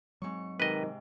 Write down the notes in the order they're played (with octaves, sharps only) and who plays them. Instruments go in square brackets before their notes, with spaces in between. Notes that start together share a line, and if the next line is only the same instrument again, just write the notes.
[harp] G#2 C#6 [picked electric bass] F#3 G#3 C4
[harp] G#2 C3 [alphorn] D#3 [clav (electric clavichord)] B4 D#5